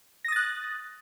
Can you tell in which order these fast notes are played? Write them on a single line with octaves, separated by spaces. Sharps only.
A#6 D#6 A6 F#6